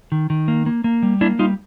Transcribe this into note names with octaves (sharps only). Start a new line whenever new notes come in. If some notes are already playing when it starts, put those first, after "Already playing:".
D#3
D#3
A#3
A#3
A#3
G3
A#3 D4 E4
G3 D#4 F4